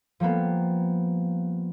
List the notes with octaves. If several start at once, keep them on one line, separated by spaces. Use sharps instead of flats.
F3 G3 A#3 B3